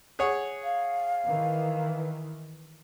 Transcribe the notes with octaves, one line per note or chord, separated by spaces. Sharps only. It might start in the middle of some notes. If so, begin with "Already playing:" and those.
G#4 C#5 F#5
F5
D#3 E3